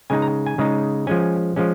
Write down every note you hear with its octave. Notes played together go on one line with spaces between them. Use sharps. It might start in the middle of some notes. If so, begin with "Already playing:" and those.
C#3 G#3 D#4 G#5
A#5
G#5
C#3 G#3 D#4
F3 G#3 C#4 G#5
F3 G#3 C#4